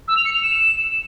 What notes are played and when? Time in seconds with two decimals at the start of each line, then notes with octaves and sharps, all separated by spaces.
0.08 E6
0.17 F7
0.25 C#7
0.34 F7
0.43 E7